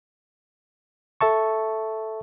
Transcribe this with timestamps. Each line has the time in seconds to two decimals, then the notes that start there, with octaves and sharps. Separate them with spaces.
1.21 A4 E5 A5 C#6